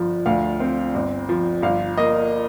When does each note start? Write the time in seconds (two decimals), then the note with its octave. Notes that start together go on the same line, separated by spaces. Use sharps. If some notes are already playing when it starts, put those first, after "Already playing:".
Already playing: G1 F3
0.26 D2 F5
0.60 C4
0.94 G1
1.29 F3
1.62 G1 F5
1.97 A#3 D#5